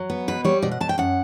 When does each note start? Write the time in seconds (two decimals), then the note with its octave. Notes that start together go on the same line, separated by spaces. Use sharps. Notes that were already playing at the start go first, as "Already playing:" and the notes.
Already playing: F#3
0.10 B3
0.28 B2 B4
0.45 G3 C#5
0.62 B2 D5
0.71 F#5
0.81 B2 A5
0.89 G5
0.98 F#2 F#5